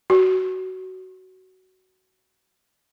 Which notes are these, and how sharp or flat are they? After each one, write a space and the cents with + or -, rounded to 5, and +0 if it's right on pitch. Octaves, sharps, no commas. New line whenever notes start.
F#4 +15